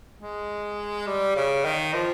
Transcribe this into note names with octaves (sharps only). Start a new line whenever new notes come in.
G#3
G3
C#3
D#3
F3